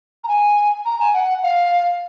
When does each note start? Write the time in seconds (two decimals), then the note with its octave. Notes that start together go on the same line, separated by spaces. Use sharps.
0.24 A#5
0.28 G#5
0.85 A#5
1.00 G#5
1.14 F#5
1.43 F5